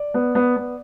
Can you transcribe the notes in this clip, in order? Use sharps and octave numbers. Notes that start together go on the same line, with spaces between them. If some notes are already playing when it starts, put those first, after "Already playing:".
Already playing: D5
B3
B3
B3